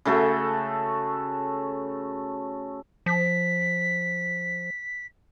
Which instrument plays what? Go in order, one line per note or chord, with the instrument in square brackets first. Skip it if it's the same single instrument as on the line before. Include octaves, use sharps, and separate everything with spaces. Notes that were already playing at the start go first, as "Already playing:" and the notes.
[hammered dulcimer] C#3 A3 F#4 A4
[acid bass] F3 [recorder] B6